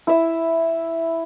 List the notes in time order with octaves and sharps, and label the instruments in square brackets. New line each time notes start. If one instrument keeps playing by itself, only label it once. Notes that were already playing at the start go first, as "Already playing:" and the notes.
[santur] E4 E5